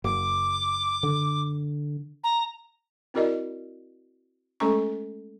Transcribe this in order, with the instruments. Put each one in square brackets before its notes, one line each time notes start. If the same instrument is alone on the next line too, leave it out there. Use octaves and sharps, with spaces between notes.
[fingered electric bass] F#1 [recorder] D6
[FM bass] D3
[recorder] A#5
[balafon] C4 E4 F#4 A#4 D5 D#5
G#3 A3 C#4 A4 A#5 C#6